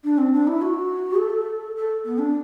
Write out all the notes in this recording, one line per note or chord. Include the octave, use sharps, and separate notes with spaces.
D4
C4
D4
E4
F#4
A4
A4
B3
D4